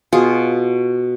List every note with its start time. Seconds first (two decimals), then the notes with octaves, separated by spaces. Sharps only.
0.13 B2 F4 G#4